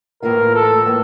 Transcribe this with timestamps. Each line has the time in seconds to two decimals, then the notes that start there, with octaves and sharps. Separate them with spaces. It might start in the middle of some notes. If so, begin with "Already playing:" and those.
0.23 A2 E3 A#3 F4 A#4
0.54 A4
0.85 A2 E3 A#3